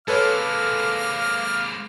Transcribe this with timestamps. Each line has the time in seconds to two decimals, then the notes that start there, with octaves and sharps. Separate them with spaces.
0.08 G#3 A#3 A4 B4 C#5 F5 D6 F6